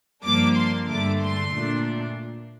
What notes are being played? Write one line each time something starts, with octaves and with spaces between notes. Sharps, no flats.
G2 F3 A#3 D4 D6
C6
G2 D3 A3 D4 D6
C6
A#2 A3 D4